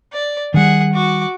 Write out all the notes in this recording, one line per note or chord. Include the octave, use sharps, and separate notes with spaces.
D5
D#3 G3 G#4 F#5
F#4 D6